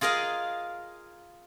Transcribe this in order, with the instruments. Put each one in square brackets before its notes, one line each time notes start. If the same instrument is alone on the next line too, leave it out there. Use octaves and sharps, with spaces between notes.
[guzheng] F4 G#4 A#4 D#5 F5